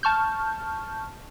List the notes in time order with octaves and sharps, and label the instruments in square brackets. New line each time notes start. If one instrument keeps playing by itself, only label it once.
[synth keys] A5 C#6 F6 G6